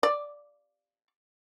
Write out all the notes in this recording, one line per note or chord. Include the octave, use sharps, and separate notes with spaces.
D5